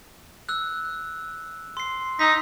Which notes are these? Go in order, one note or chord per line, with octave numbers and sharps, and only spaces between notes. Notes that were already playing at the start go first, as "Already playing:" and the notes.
E6 F#6
C6 C7
D#4 A#5 E6 B6